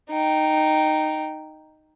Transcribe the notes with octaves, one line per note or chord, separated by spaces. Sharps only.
D#4 G5